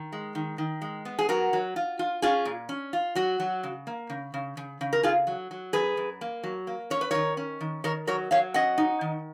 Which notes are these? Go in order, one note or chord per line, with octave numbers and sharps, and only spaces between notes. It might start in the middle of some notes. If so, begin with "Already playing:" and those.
Already playing: D#3
G#3
D#3
D#3
G#3
B3
G#4
F#3 F#4 A#4
F#3
F4
F4
C#4 F4 G#4
A#2
C#4
F4
F#3 F#4
F#3
C#3
A#3
C#3
C#3
C#3
C#3
A#4
C#3 F4 G#4
F#3
F#3
F#2 G#4 B4
F#2
A#3
F#3
A#3
C#4 C#5
B4
D#3 A#4 C#5
C#4
D#3
D#3 A#4 C#5
F#3 A#4 C#5
F#3 C#5 F5
C#4 D#5 F#5
D#4
D#3